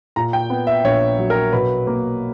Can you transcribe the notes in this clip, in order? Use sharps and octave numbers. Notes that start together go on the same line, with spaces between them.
A#2 A#5
G5
B3
E5
A#1 C#5
F#3
A#4
B2 B4
A#3